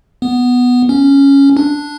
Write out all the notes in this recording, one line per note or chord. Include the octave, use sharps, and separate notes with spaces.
B3
C#4
D4